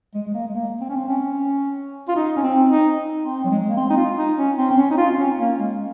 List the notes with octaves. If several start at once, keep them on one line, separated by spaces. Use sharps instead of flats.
G#3
G#3
A#3
G#3
A#3
C4
C#4
C4
C#4
F4
D#4
C#4
C4
D#4
C4
F#3
G#3
A#3
C4
D#4
F4
D#4
C#4
C4
C4
C#4
D#4
F4
C4
C#4
A#3
G#3